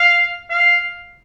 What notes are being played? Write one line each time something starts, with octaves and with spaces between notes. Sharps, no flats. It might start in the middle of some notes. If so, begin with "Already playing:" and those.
Already playing: F5
F5